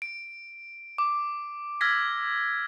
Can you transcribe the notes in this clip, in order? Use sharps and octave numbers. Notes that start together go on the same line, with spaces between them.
D7
D6
E6 F6 G#6 A#6 B6